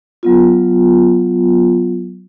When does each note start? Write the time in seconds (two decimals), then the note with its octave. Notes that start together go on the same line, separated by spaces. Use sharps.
0.23 F#3 B3 F4